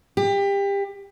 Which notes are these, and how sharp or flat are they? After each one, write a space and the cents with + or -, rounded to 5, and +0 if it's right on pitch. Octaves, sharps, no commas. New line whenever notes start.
G4 +25